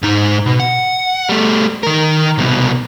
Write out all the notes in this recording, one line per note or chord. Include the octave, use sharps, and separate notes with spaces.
G#2 D#4
B2
F#5
G3 A3
D#3 A#4
C2 B2